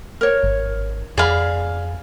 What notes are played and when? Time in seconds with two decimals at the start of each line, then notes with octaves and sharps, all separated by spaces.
0.21 A#4 C#5
0.43 G#1
1.18 F2 G#4 D5 F5 B5